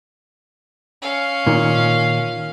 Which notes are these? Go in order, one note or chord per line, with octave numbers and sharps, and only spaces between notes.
C#4 F5
A#2 D#3